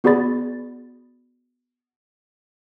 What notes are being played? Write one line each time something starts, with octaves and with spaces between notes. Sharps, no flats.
B3 F#4 G#4 D5 B5 A6